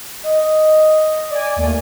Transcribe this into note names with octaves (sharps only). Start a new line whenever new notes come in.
D#5
D5 G#5
D#2 A3 A#3